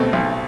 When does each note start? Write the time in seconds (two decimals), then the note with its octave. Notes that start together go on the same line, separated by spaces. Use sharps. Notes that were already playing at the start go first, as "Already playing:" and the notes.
Already playing: B2 A3 C4
0.13 B1